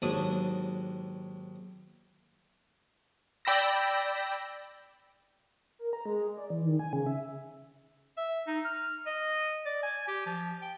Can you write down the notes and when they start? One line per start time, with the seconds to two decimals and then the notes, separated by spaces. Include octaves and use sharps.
0.02 D#2 G#2 F#3 D4 D#6
3.45 D5 G5 B5 E6 A#6
5.79 A#4
5.93 A#5
6.06 G#3
6.37 D5
6.50 E3
6.65 D#3
6.79 G#5
6.93 C#3
7.06 E5
8.17 E5
8.47 D#4
8.65 F6
9.07 D#5
9.66 D5
9.83 G#5
10.08 G4
10.26 F3
10.62 G5